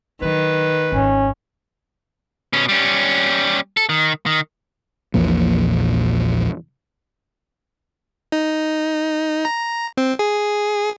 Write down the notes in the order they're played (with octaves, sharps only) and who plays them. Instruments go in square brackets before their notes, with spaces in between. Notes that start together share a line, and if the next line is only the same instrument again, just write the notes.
[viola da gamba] D#3 [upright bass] F#3 [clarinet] B4
[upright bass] G#1 F2 [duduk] C#4
[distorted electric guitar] B2 C#4
G3 C#4
A4
D#3
D#3
[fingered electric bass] A#1 E2 A#2 F3
[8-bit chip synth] D#4
A#5
C4
G#4